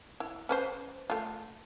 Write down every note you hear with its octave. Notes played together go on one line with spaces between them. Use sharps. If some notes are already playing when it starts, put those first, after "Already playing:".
E4
C#4 B4 C5
A3 F4